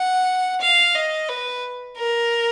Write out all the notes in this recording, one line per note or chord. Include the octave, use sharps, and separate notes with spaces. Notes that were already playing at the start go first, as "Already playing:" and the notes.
Already playing: F#5
F5
D#5
B4
A#4